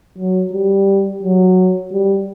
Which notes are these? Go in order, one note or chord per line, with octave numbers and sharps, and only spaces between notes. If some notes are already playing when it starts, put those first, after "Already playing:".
F#3
G3
F#3
G3